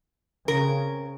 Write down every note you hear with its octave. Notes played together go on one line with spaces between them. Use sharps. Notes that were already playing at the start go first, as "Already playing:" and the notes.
C#3 C4 A#4